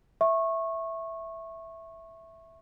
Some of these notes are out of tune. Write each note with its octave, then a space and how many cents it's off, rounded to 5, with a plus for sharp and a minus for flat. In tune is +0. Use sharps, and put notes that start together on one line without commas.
E5 +0 C#6 -20